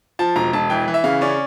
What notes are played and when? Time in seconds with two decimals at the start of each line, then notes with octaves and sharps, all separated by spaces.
0.19 F3 A5
0.36 E1 A#5
0.53 E1 A5
0.70 E3 G5
0.88 E3
0.94 E5
1.04 C#3 F5
1.21 C#4 D5